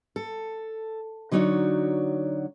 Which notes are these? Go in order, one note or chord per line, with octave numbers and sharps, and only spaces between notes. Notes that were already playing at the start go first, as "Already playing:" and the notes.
A4
D3 F#3 D#4 F#4 C#5 D5